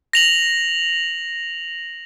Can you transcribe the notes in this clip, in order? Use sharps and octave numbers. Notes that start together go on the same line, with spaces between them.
A#6 F7 F#7